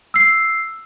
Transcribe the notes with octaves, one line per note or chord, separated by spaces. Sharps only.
E6 C7